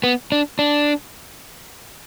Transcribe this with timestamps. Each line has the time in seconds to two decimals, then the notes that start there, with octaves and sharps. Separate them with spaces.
0.04 B3
0.32 D4
0.59 D4